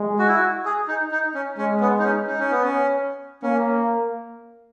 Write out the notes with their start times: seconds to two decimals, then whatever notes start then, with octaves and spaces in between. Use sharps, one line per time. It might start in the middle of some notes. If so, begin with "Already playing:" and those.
Already playing: G#3
0.19 F#4
0.27 E4
0.36 F#4
0.65 G#4
0.88 D#4
1.12 D#4
1.34 C#4
1.58 G#3 C#4
1.81 B3
1.99 D#4
2.04 C#4
2.27 D#4
2.40 C#4
2.51 B3
2.63 C#4
3.43 A#3 C#4